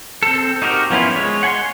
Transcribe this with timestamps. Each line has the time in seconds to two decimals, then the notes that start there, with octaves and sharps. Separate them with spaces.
0.23 C4 A4
0.62 D#4 F#4 G4 A#4
0.90 F3 B3 C#4 E4 F4
1.16 G#3 C#5
1.43 F#5 G#5 B5 C6